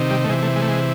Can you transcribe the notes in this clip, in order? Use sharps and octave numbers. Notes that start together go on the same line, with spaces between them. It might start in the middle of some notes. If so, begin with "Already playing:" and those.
Already playing: C3 D#3
G3
A3
C3 E3 G#3
A3
G#3
A3
G#3